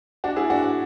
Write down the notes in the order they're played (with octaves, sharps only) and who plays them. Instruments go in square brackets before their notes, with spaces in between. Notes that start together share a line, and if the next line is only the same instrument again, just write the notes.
[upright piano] D4 F#4
E4 G#4
D4 F#4